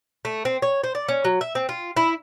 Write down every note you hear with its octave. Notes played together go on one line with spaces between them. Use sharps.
A3
C4
C#5
C5
D5
C#4
F#3
E5
C4
F4
E4